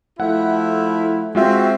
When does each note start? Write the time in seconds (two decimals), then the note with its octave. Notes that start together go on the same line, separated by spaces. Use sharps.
0.20 F3 A3 E4 F#5
1.35 G#3 C4 F4 F#4 E5